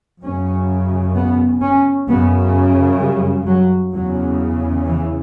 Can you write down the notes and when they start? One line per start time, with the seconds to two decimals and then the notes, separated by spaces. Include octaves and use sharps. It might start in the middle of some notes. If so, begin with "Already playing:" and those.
0.23 F#2 C#3 C#4
1.16 B3
1.62 C#4
2.08 F#2 C#3 B3
3.00 G3
3.47 F#3
3.93 E2 C#3 F#3
4.86 E3